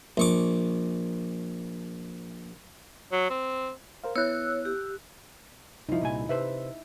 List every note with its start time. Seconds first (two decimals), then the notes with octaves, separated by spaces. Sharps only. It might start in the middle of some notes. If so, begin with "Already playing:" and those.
0.17 A#1 C#6 D6
3.12 F#3
3.30 C4
4.04 A#4 C5 F5
4.16 B3 E4 C#5 E6 F#6
4.65 G4
5.89 C2 F3 D#4 E4
6.01 C2 A#2 G#5
6.29 C3 B4 C5 E5